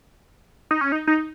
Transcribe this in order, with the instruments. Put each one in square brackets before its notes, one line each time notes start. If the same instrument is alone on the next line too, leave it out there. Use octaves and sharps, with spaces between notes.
[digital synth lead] D#4
C#4
D#4
D#4